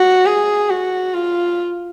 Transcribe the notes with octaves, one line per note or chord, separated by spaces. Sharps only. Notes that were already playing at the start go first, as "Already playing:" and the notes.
Already playing: F#4
G#4
F#4
F4